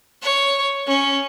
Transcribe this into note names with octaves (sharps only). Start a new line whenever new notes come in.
C#5
C#4